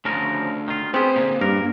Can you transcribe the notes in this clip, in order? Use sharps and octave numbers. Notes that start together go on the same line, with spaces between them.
D2 C#3 F3 A#4
D#3 F4
B3 C4 G4 G#4 B4 C6
D2 A#2 A#3
G2 A#4